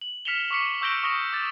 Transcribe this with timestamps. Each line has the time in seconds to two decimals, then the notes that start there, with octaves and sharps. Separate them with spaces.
0.01 F#7
0.25 F6 B6 C#7 E7 F7 G7
0.51 C#6 D6 B6 C#7
0.81 C#6 E6 G6 A#6 D7 G7
1.03 C#6 D#6 A#6 G7
1.32 D6 A6